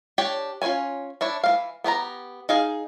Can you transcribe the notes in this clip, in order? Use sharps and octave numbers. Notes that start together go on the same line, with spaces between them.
D4 G4 C#5 G5
C#4 F4 B4 C#5 G#5
D4 E4 C#5
E3 A#3 F5
B3 G4 B4 A#5
D#4 G#4 F5